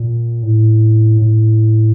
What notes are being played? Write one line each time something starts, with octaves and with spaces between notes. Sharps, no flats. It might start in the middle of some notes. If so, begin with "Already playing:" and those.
Already playing: A#2
A2
A2